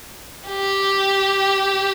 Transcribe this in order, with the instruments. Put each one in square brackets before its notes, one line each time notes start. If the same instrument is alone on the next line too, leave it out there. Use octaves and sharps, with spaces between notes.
[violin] G4